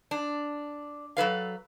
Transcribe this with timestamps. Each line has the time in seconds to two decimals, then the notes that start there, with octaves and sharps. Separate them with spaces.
0.11 D4
1.17 F#3 A4 B4 F5